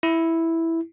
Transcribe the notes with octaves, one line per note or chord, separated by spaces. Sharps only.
E4